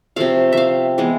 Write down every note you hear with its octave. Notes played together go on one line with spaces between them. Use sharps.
C3 F3 A3 F5
E5 F5
E3 G#3 B3